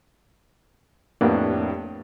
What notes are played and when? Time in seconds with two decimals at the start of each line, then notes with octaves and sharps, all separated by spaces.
1.21 F2 A2 A#3 B3 D4 G4